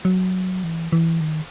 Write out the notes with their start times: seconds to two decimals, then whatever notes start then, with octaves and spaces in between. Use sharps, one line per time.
0.05 F#3
0.64 E3
0.92 E3
1.21 D#3